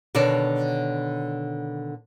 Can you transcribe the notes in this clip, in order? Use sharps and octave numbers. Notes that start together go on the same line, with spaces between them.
B2 D3 D#3 C#5 D5 A5